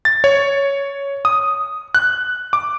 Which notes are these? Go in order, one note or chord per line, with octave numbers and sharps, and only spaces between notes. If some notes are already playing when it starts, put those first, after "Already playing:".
A6
C#5
D#6
F#6
D6